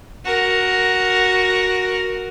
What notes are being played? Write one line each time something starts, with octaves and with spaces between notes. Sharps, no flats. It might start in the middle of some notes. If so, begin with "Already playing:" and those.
F#4 A#4